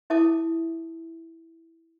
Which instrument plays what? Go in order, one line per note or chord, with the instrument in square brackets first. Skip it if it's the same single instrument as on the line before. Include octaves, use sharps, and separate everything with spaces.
[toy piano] E4 E5 A5 D6 D#6